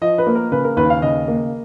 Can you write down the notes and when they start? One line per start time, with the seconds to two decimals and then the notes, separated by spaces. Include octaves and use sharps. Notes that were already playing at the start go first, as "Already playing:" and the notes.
0.01 F3 D#5
0.18 B4
0.26 A#3
0.35 A#4
0.52 C#3 B4
0.64 A#4
0.76 D#2 B4
0.90 F5
1.02 C#3 D#5
1.28 A#3